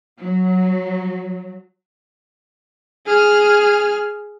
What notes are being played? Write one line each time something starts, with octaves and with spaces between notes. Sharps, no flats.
F#3
G#4 F6